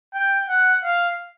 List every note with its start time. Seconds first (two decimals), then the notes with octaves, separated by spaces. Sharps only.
0.14 G5
0.49 F#5
0.84 F5